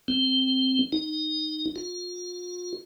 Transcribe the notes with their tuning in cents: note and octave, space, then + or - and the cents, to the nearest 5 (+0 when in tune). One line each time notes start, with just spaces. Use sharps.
C4 +0
D#4 -10
F4 +35